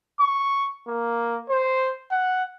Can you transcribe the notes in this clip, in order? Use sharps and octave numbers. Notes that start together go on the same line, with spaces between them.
C#6
A#3
C5
F#5